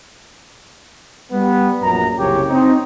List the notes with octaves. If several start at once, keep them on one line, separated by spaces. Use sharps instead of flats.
G3 B3
A#1 F#2 A#5
F#1 C2 C#3 G4 C#5
C4 D#4